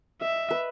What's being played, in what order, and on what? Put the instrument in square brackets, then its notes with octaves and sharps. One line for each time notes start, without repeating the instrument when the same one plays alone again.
[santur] D#5 [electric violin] E5
[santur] B4